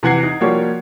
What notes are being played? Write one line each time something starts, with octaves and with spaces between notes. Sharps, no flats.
C3 E3 F#5 G#6 C7
D#4
F3 G3 A#3 F#4 G4 C#5